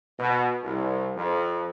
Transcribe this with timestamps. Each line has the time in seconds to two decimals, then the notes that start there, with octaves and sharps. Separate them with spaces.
0.17 B2
0.62 C2
1.15 F2